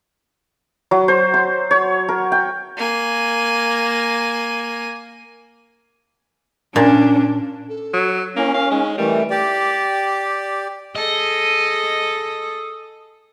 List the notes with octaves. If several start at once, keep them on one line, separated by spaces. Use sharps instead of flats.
F#3
C5
C6
C#5
A#4
G5
A#3 G#5
A#2 C#4 D4
A4
F#3
A#3 C#4 E4
A#4 F5
G#3 D#4
E3 G3 A3 A#4
G4 D5
G#4 A4 D#5